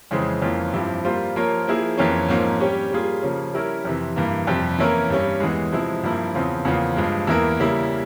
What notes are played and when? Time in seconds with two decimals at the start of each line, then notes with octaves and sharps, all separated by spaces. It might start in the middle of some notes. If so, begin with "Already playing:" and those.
0.11 F2 C#3 E3 G#3 C4
0.42 F2 E3 A#3 C#4 F4
0.73 G2 F3 C4 E4 G4
1.05 G3 A#3 F4 C5
1.36 F3 A#3 F4 A#4 C#5
1.67 F3 A#3 E4 G#4
1.97 F2 E3 A#3 C#4
2.29 G#2 F3 A#3 C#4
2.60 G3 C#4 G4 C#5
2.91 G3 A#3 F4 G#4
3.22 C#3 F3 A#3 C#4
3.53 G3 C#4 E4 A#4
3.85 F2 C3 E3
4.16 G2 E3 A#3
4.47 F2 C3 G3
4.78 E3 A#3 C#4 E4 A#4
5.10 G2 G3 C#4
5.40 E2 E3 G#3
5.72 C3 F3 G#3 E4
6.03 G2 F3 A#3 E4
6.35 E2 C#3 F3 C4 F4
6.65 E2 C#3 F3 A#3 F4
6.97 G2 F3 G#3
7.27 E2 E3 A#3 E4 A#4
7.60 C#3 G3 A#3 E4